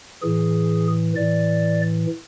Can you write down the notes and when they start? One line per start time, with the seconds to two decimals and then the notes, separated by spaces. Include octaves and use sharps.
0.22 A2 E3 G#4
1.16 A2 E3 D5